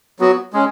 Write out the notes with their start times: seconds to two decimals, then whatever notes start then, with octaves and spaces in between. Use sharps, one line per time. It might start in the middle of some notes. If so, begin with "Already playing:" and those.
0.20 F#3 B3 F#4
0.53 G#3 C#4